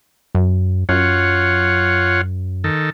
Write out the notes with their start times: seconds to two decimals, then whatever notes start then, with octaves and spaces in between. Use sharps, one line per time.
0.35 F#2
0.89 F#2 F4 C#5 F#5
2.64 D#3 A4